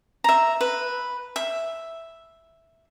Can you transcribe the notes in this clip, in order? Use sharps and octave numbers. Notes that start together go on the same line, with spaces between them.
E5 A#5
B4
E5